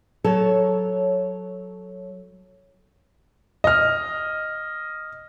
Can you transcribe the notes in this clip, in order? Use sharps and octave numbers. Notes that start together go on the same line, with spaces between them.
F#3 A4 C#5 A5
D#5 F6